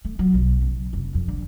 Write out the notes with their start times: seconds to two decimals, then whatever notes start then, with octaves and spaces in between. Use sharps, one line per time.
0.05 A3
0.19 F#3
0.34 B1
0.61 C#3
0.93 F1
1.14 F2
1.28 D3